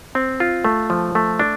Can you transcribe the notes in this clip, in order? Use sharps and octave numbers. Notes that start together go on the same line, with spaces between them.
C4
F4
A3
F3
A3
D4